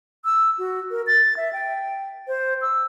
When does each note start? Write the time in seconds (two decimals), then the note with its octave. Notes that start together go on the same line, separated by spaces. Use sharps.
0.25 E6
0.59 F#4
0.91 A#4
1.07 A6
1.37 E5
1.53 G5
2.28 C5
2.62 E6